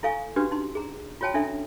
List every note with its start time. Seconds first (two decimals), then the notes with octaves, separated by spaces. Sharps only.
0.03 E4 A4 F5 G#5 C#6
0.36 C#4 D4 F#4 G4 B4
0.51 D#4 C6
0.75 G#4 A#5
1.21 F4 F#4 C#5 G5 A5
1.34 C#4 D4 E4 A4 E5 A5